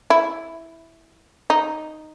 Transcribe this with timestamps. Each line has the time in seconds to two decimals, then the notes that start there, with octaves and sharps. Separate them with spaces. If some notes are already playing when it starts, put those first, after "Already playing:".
0.10 E4
1.50 D#4